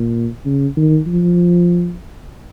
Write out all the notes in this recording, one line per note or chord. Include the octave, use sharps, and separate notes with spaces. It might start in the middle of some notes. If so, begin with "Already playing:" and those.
Already playing: A#2
C#3
D#3
F3